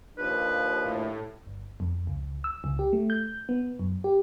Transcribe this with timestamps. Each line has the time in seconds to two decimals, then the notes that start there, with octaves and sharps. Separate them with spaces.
0.17 D#2 F3 D4 B4
0.84 A2
1.46 G1
1.80 F2
2.07 C#2
2.44 E6
2.64 C#2
2.79 G4
2.93 A3
3.10 G6
3.49 B3
3.79 F#2
4.04 G4